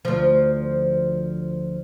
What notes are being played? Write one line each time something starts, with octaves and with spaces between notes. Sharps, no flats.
D2 F3